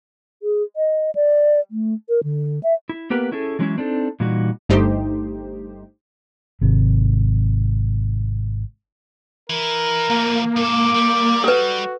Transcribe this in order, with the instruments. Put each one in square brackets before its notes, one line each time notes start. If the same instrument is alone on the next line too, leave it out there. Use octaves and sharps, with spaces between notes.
[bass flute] G#4
D#5
D5
A3
A#4
D3
E5
[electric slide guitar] E4
A#3 B3 G4 A#4 B4
C#4 E4 G#4 A4
E3 F#3 G#3 C4 C#4 E4
C4 D4 D#4 A4
A#2 E3 G3 D#4 F#4
[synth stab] G1 G2 A3 D#4 G4 C5
[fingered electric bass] G#1 C3
[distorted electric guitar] E3 E4 [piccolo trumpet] A#4
[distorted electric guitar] F3 A3 [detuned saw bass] A#3
[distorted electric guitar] G#2 A4 [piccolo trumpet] D6
[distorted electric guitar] G3
[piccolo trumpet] F#4 [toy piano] A4 B4